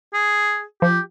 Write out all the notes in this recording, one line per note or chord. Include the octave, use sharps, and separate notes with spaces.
G#4
F3 G4